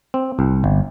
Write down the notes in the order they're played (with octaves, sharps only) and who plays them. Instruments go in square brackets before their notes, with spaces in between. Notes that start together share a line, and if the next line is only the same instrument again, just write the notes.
[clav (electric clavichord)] C4
C2
G1